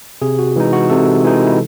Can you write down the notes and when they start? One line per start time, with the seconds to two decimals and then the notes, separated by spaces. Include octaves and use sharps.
0.22 C3 G#4
0.39 F#4
0.56 E3 G#3 D#4
0.73 F#4
0.90 C3 A4
1.24 E3 G#3 D#4
1.46 E4